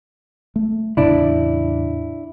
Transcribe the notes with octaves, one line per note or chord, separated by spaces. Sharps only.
A3
E2 A2 C#3 D4 E4